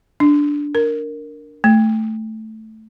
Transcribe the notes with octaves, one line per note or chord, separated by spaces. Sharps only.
D4
A#4
A3